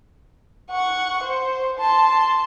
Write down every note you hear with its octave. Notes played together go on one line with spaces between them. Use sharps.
F#5 C#6
C5
A5 C6